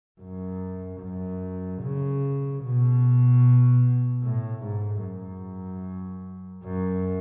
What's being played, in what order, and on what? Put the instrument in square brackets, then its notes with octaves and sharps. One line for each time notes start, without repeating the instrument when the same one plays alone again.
[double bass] F#2
F#2
C#3
B2
A2
G#2
F#2
F#2